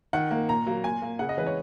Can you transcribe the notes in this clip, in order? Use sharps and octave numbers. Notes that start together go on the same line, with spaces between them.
D#3 F#5
A#3
A#2 A#5
F#3 A#3
A#2 G#5
A#3
C#3 F#5
D#5
E3 G#3 B4
C#5